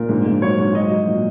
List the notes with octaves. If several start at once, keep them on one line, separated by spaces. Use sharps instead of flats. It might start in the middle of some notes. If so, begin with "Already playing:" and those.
Already playing: A#2 A#4
G#2
G#2
F#3 C#5
G#2
F#3 D#5
F#3
A#2